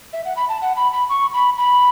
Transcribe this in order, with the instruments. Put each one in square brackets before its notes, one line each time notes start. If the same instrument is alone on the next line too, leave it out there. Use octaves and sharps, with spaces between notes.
[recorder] E5
F#5
B5
A5
F#5
B5
B5
C#6
B5
B5